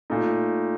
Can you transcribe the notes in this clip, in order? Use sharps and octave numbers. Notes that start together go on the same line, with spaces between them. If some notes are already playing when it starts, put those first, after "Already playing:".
A#2 A3 D#4